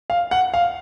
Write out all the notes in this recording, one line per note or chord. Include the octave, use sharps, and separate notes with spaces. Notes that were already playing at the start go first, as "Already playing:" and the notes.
F5
F#5
F5